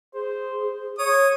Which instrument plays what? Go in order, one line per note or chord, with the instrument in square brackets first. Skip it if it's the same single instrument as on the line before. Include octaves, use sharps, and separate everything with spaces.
[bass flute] G#4 [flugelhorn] C5
[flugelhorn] C#5 [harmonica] D#6